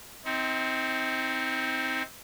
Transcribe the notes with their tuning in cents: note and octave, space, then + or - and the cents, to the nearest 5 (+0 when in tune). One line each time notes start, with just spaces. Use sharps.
C4 +0 D#4 +35